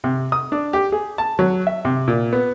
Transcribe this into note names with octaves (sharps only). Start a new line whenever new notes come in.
C3
D#6
D4
G4
G#4
A5
F#3
E5
C3
A#2
B3